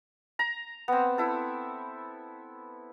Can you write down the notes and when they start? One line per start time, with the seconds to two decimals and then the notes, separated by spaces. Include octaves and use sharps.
0.39 A#5
0.88 B3 C4
1.18 E4 A4